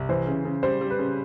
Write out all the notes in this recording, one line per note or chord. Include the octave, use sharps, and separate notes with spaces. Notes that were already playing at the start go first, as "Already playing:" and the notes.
Already playing: C2
E3 C5
C#3
C#3
G3 C5
G3
B4
C#3